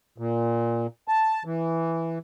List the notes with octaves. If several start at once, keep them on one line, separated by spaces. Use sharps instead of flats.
A#2
A5
E3